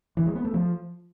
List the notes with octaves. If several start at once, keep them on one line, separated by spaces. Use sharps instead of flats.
E3
G#3
B3
A3
F3